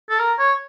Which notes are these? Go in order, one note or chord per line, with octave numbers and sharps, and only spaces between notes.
A4
A#4
C#5